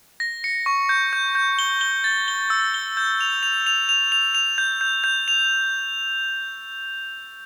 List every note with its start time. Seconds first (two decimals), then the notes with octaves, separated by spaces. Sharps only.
0.20 A#6
0.44 C#7
0.66 C#6
0.89 G6
1.13 G6
1.35 G6
1.59 G7
1.81 G7
2.04 A6
2.28 G7
2.50 E6
2.74 G7
2.97 G6
3.21 F7
3.43 F7
3.67 F7
3.89 F7
4.12 F7
4.35 F7
4.58 G6
4.81 G6
5.04 G6
5.28 F7